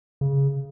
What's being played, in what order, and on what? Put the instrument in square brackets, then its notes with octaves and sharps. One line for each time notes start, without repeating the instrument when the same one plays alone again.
[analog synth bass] C#3